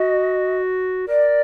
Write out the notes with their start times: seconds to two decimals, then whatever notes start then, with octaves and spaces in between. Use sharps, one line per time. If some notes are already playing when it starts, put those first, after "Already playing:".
Already playing: F#4 D#5
1.08 A#4 D5